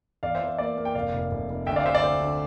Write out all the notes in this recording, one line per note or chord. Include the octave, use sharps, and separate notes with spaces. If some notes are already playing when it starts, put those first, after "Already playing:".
E2 D5 F5
C5 E5
E3
C5
A#3 D5
A#3
G5
F1 D5 F5
F1
F1
F1
D2 E5 G5
D5 F5
D2 C5 E5
D5
D2 C5
D3